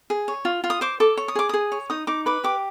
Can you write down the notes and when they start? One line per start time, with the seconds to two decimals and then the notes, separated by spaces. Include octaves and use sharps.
0.10 G#4
0.28 C#5
0.45 F4
0.64 F4
0.70 D#6
0.81 C5 D6
1.00 A4 D6
1.17 C#5
1.28 D#6
1.35 G#4 D6
1.49 G#4 D#6
1.72 C#5
1.90 D#4 D#6
2.07 D#4 D6
2.26 B4 D6
2.44 G4 D6